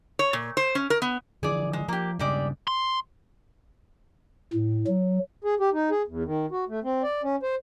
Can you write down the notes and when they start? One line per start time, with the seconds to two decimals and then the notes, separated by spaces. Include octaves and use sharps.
0.19 C#5
0.33 A#2
0.57 C5
0.75 C#4
0.90 A#4
1.02 B3
1.43 D3 E3 F3 G#4 D5
1.73 G#3
1.88 F3 A#3 G4
2.19 G2 C#3 G3 G#3 D5
2.68 C6
4.53 A2
4.87 F#3
5.44 G#4
5.60 G4
5.73 D#4
5.91 G#4
6.07 E2
6.25 D#3
6.51 F#4
6.69 A3
6.84 C4
7.03 D5
7.23 C#4
7.43 C5